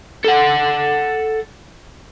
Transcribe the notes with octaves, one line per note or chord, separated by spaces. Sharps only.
A4 F#5